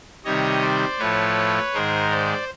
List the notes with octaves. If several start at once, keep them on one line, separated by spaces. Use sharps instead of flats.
C3 D#3 G3 C#5 D#5
C5 D5
A2 F3 A3 B4 C#5
G#2 D#3 G#3 A#4 C5
C5 D5